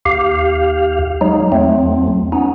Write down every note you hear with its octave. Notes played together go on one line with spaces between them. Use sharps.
D#2 G4 F5
F#3 G#3 D#4
E2 F#3 A3 C4
B3 C#4 D#4